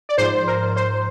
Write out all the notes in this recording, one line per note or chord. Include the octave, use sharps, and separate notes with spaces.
D5
G#2 F3 C5
A#4
C5